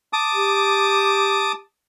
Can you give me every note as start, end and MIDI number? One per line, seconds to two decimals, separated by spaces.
0.13 1.52 81
0.13 1.52 86
0.13 1.52 87
0.33 1.61 67